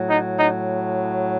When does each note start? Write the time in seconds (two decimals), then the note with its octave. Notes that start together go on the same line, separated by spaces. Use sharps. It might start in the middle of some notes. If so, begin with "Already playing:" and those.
Already playing: A2 F#3
0.10 D#4
0.40 D#4